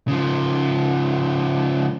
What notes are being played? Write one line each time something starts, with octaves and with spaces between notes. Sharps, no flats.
C#3 F3